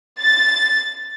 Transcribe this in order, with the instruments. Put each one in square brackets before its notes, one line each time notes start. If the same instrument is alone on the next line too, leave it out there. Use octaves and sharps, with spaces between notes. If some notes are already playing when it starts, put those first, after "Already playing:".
[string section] A6